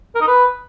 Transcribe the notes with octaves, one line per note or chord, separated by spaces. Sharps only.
A#4
D#4
B4